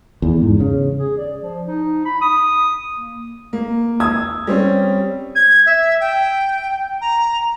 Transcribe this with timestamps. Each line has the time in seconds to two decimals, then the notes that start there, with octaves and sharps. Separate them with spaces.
0.22 E2
0.42 G#2
0.60 C#3
0.99 G#4
1.17 D5
1.40 F3
1.67 D#4
2.05 B5
2.21 D#6
2.94 A#3
3.53 A#3
4.00 D#6 E6 G#6
4.47 G3 C4 C#4
5.35 G#6
5.66 E5
6.00 G5
7.01 A#5